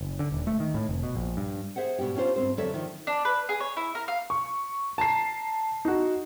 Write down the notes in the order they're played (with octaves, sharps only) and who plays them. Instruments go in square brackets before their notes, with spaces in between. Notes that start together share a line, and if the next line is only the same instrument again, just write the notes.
[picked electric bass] F#1
D3
D#1
A3
D#3
A2
F1
B2
A#1
G2
[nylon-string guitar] G#4 C5 E5 F#5
G2 B2 B3 D4 G4
C#4 D4 F4 C5
G2 B2 C4 C5
F2 D3 F#3 A4 D5 E5
D#3 F3
[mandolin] D4
B4
G#4
C#5
E4
A#4
F5
[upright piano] C#6
A5 A#5 C7
D#4 F#4